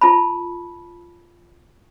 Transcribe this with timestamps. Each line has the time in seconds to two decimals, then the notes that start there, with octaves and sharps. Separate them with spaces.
0.01 F4 A5 B5